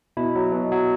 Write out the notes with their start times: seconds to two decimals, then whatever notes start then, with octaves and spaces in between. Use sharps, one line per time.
0.17 B2 E4
0.35 F#3
0.53 B2
0.71 F#3